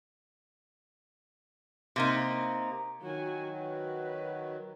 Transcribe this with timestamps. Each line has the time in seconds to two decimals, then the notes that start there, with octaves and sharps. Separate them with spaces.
1.96 C3 A#3 D#4
3.01 D#3 F#3 F#4 G#5
3.58 B4